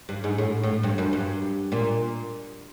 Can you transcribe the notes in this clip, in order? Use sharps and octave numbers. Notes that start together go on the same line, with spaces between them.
G2
G#2
A2
A2
G2
F#2
G2
A#2